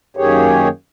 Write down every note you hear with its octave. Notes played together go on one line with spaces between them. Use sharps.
F#2 D#3 A#3 G4 G#4 C#5